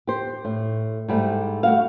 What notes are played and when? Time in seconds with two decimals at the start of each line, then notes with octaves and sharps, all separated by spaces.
0.07 G4 C5
0.45 A2
1.08 G#2 G3 A3
1.63 A3 F#4 F5